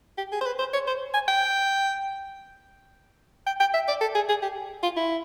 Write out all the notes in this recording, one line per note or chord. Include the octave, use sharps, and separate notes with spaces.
G4
G#4
C5
B4
C5
C#5
C5
G#5
G5
G5
G5
E5
D5
A4
G#4
G#4
G4
F4
E4